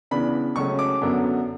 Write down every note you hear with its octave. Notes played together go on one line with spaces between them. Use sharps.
C#3 E3 B3 D4 B5
C#2 C#3 F#3 A3 C#4 C#6
D6
F#2 D3 F#3 B3 D4